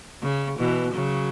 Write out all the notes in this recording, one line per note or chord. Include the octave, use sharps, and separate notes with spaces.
C#3
B2 E3
C#3 F#3